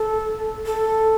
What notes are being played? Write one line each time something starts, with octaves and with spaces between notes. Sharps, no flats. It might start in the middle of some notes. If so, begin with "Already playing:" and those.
Already playing: A4
A4